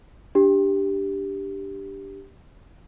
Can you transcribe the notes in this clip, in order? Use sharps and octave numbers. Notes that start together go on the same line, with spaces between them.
D4 G4